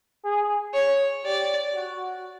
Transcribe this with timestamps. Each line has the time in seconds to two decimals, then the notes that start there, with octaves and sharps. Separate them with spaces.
0.24 G#4
0.74 C#5
1.25 G4 D5
1.75 F#4